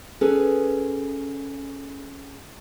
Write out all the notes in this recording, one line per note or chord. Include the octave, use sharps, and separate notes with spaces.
C#4 G#4 A4 B4